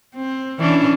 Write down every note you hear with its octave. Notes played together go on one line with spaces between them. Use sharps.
C4
E3 C#4 D4